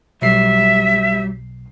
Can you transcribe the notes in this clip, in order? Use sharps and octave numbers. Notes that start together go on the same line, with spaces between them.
B1 F#3 G3 E5 C7